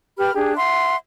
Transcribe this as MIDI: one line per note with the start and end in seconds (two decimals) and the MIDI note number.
0.18 0.32 67
0.18 0.32 71
0.18 0.32 83
0.18 0.32 89
0.34 0.54 62
0.34 0.54 67
0.34 0.54 68
0.56 0.96 76
0.56 0.96 78
0.56 0.96 84